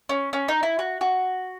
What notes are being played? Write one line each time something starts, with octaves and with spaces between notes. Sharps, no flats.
C#4
C#4
D#4
E4
F#4
F#4